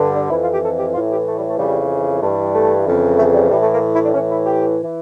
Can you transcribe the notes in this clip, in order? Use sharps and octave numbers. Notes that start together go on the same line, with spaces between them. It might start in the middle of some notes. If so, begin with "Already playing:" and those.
Already playing: G2 D3
D4
F2 E3 E4
F4
G4
A4
G4
A2 E3 F4
G4
A3
G3
A3
F2 C#3 E3 G3
G2 E3 A3
G3
G3
A3
F2 C#3 E3
A3
G3
A2 E3 G3
A3
A#3
E4
D4
A2 E3 C#4
E4
G4
E3